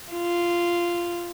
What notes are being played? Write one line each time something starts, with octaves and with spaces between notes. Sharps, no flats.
F4